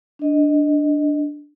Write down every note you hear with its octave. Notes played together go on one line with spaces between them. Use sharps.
D4 D#5